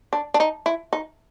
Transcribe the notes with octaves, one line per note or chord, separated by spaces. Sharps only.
D4
D4
D#4
E4
D#4